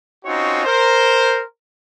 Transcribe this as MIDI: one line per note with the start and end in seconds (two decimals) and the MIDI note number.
0.25 0.63 60
0.25 0.63 61
0.25 0.63 63
0.25 0.63 65
0.25 0.63 66
0.25 0.63 73
0.65 1.41 70
0.65 1.41 72